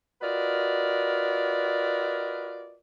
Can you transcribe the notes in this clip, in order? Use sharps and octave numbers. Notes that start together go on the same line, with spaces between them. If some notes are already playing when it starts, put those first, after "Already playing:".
F4 F#4 A#4 B4 D5 D#5